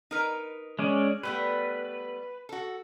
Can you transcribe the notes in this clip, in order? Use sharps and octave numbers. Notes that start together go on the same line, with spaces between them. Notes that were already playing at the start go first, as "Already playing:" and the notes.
D#4 A#4 B4
G#3 C#4 D5
G3 A3 B3 B4
F#4 A4